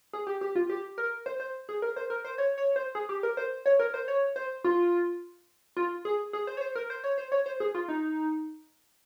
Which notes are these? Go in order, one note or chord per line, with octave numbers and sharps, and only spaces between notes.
G#4
G4
G4
F4
G4
A#4
C5
C5
G#4
A#4
C5
A#4
C5
C#5
C#5
C5
G#4
G4
A#4
C5
C#5
A#4
C5
C#5
C5
F4
F4
G#4
G#4
C5
C#5
C5
A#4
C5
C#5
C5
C#5
C5
G#4
F4
D#4